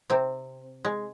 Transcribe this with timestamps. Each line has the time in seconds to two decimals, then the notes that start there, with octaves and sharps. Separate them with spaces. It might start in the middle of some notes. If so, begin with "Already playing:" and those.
0.10 C3 C4
0.85 G#3